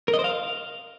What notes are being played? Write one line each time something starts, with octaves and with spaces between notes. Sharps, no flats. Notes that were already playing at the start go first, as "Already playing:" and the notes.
A#4
D#5
C5
F5